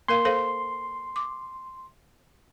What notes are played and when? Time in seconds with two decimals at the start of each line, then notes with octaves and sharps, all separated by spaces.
0.08 A#3 A#4 F5 C6
0.25 A4 C5 F5
1.16 D6